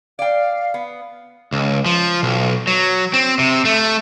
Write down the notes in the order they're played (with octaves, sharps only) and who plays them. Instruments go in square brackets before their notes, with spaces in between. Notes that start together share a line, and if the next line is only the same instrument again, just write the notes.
[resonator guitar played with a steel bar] D5 G5 [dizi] F5
[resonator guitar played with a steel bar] B3
[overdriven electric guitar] C#2
F3
B1
F#3
C4
C3
A3